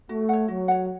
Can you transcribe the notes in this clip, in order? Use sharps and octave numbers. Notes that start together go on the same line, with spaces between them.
A3 F#4
C#5 F#5
F#3 F#4
C#5 F#5